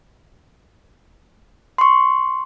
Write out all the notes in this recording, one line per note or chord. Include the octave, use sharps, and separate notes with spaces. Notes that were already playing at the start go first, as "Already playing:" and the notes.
C6 C#6